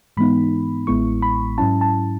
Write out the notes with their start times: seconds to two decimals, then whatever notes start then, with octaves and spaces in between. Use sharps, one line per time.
0.17 G#2 E3 G#3 B3 D#4 B5
0.87 A1 A2 G#3 B3 E4 C#6
1.22 B5
1.58 G#2 F#3 C#4 E4 A5
1.81 A5